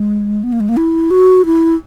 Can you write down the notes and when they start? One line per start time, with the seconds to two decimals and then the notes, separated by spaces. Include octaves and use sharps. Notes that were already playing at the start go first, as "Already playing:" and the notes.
Already playing: G#3
0.44 B3
0.52 A#3
0.60 G#3
0.69 A#3
0.77 E4
1.11 F#4
1.46 E4